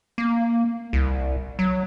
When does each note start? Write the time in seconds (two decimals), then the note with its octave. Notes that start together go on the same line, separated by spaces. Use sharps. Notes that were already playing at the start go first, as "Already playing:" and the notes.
0.18 A#3
0.93 C2
1.59 F#3